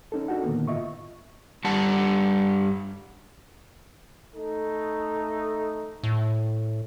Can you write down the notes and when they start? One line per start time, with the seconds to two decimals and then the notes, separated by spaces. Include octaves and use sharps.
0.12 C#4 D#4 A4
0.28 D4 D#4 F#4 A4 F#5
0.43 A#2 D3 D#3 A#3 B3
0.68 G#2 F4 D#5 E5 C#6
1.65 G2 G3 D4 F#5 A5
4.35 A3 D#4 A4
6.03 A2